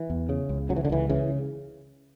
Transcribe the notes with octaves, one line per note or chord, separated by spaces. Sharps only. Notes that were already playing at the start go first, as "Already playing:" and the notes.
Already playing: E3
E2
C#3
C#2
C#3 F#3
E3
D3
C#2 E3
C#3 E3